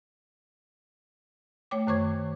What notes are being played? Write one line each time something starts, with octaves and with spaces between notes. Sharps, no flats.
A3 C#5 G5 D6
F#2 D#3 C5 C#6 D6 G#6